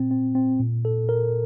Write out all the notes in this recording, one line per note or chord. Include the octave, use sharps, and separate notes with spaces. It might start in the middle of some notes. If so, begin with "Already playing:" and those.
Already playing: A#2 C4
C4
C4
A#2
A4
A#4